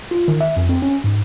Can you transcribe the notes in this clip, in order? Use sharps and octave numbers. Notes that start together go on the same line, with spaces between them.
F4
D#3
E5
F2
C4
C#4
G#2